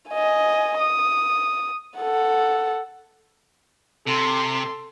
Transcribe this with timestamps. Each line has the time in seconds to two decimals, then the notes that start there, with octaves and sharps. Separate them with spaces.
0.10 D#5 G#5
0.79 D#6
1.99 A4 F#5
4.07 C3 A4 C6